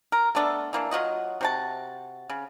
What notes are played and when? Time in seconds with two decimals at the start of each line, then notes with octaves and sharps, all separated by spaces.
0.12 A#4
0.35 A3 B3 D4 A4
0.73 E3 A#3 D4
0.91 F#3 F4 F#4 D#5
1.41 C3 F#4 A5
2.30 C#3